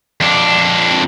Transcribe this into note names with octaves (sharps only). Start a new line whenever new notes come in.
F2 D4